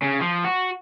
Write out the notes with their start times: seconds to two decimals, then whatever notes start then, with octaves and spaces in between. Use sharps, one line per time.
0.03 C#3
0.21 F3
0.45 F#4